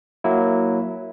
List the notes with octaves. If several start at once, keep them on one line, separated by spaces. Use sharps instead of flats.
F#3 A#3 E4